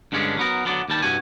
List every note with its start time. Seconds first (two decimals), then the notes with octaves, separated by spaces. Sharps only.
0.12 G2 D3 G#3 C#4 D4
0.37 F#3 B3 A#4
0.65 D3 F#3 B3 D5
0.88 D#2 G3 A5
1.02 C2 G2 F#4 G#5